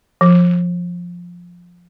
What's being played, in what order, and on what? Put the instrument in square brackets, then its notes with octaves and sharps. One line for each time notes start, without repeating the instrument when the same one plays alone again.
[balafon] F3